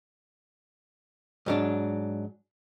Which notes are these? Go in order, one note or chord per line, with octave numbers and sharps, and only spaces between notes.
G#2 F#3 D4